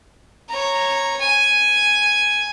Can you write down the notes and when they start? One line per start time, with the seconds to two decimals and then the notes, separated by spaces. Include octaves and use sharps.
0.49 C#5 A#5
1.21 G#5